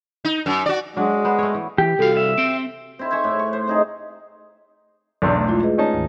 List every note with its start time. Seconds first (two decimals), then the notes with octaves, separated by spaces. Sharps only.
0.25 D#4
0.46 F#2
0.66 F#4 D5
0.97 F#3 G#3 D4
1.25 B3 C5
1.39 A3 C#5
1.55 E3
1.78 E3 G4
1.99 C2 F#4 A4 F5
2.17 E5
2.38 C4 G5 D7
2.99 C4 E4
3.11 C5 E5 G#5 C#6
3.24 A2
3.39 C#6
3.53 C5
3.67 C4 D#4 G#4
5.22 B1 E2 D4
5.35 A3
5.47 G#3 E4 F4
5.63 G#4 B4 D#5
5.78 C#4 D#4 A5
5.93 D2 G#2 D#3